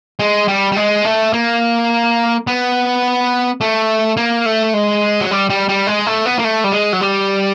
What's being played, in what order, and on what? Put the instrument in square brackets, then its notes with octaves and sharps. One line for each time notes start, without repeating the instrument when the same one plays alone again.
[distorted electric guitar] G#3
G3
G3
G#3
A3
A#3
B3
A3
A#3
A3
G#3
F#3
G3
G3
G3
G#3
A3
B3
A#3
A3
G3
G#3
F#3
G3